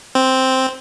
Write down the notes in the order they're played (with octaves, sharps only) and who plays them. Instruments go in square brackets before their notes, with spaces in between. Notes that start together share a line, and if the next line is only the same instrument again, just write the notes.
[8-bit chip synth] C4